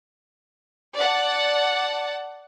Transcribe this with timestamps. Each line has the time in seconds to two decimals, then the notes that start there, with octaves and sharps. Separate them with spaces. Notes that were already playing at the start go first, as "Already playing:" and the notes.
0.97 D5 F#5 A5